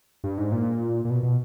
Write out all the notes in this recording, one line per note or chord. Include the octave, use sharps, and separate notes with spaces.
G2
G#2
A#2
A#2
B2
B2